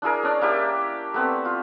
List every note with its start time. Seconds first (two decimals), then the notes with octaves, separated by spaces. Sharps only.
0.02 D4 E4 G#4 A#4
0.23 C#4 D4 D5
0.41 A#3 E4 G4
1.14 A3 B3 C4
1.45 F4